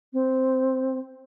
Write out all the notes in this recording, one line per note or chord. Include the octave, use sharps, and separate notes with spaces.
C4